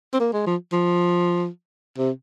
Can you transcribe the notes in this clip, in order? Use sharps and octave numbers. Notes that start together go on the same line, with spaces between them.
C4
A#3
G#3
F3
F3
C3